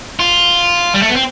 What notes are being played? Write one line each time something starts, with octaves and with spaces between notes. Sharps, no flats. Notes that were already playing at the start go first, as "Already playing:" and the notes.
F4
G3
A3
B3
C4